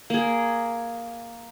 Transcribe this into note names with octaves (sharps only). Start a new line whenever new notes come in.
A#3 G#4